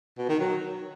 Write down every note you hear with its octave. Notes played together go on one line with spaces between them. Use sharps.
B2
D#3
F#3